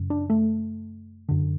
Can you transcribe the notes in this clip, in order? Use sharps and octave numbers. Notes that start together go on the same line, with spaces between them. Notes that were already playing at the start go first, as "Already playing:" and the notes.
Already playing: F#2 C#3
D4
A3
F#2 D3